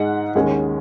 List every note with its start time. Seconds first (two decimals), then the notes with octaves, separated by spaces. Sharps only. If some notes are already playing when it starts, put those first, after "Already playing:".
Already playing: G#2 G#3 D#4 F#5
0.35 D#2 D#3 G#3 C#4